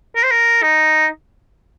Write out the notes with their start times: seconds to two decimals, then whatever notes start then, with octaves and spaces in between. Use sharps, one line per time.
0.16 A#4
0.23 C5
0.31 A#4
0.62 D#4